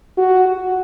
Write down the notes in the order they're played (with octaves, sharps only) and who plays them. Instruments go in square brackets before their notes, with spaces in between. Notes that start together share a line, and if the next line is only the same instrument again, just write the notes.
[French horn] F#4
F#4